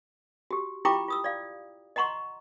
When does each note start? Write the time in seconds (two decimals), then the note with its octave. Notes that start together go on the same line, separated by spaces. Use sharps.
0.51 F#4 G4
0.85 E4 F4 G4 G5 A#5 D6
1.08 F4 D#6 E6
1.24 D5 F5
1.96 D#5 F#5 A#5 C6 C#6